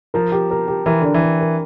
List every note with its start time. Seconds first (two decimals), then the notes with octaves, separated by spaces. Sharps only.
0.14 F3 A#4
0.32 G4
0.51 A#4
0.68 G4
0.86 E3 A#4
1.01 D3 D4
1.14 E3
1.22 A#4
1.41 A#4